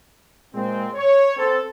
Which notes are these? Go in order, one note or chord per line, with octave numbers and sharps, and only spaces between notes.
A#2 G#3 C4
C#5
C4 A4